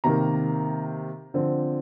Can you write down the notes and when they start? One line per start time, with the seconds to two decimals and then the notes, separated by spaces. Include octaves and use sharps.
0.04 C3 D#3 A#3 A#5
1.34 D3 F3 C4